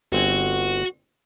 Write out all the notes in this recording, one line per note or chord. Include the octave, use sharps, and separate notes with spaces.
G1 C4 F#4 G#5